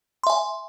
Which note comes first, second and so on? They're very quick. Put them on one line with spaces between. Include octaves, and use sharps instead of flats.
C6 E5 G#5